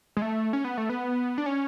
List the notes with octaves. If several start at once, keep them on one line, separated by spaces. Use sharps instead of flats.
G#3
A3
C#4
B3
A3
B3
D4
C#4